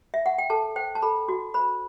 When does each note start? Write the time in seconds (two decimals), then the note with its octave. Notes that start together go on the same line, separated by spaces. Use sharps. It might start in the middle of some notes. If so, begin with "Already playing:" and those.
0.14 E5
0.26 F#5
0.38 G5
0.50 A4 A5
0.76 C5 G5
0.95 A5
1.02 A4 B5
1.28 F#4
1.54 C5 B5